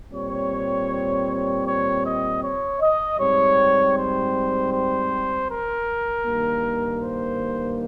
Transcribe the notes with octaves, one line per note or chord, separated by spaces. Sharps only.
A#2 G3 C4 C#5
C#5
D#5
C#5
D#5
G#2 G3 C4 C#5
C5
C5
A#4
G2 D#3 A#3
C5